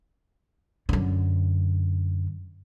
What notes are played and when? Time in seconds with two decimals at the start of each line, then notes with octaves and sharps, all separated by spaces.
0.89 F#2 D3